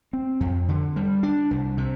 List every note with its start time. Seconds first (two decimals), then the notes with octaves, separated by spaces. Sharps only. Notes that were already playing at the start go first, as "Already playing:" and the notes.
0.13 C4
0.40 F2
0.69 D3
0.96 G3
1.23 D4
1.51 C2
1.78 C3